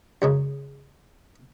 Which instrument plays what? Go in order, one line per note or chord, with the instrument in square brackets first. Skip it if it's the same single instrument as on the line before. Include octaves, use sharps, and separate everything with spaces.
[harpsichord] F#2 C#3 G#3